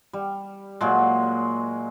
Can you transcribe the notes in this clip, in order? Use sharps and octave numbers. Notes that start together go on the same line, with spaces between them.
G3
A#2 F#3 G#3